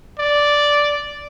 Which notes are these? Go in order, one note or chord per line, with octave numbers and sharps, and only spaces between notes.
D5